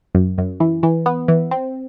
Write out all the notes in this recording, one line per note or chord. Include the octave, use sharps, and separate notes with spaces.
F#2
F#2
E3
E3
B3
E3
C4